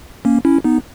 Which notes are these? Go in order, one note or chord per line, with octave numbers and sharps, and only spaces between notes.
A#3 C#4
C#4 E4
B3 D#4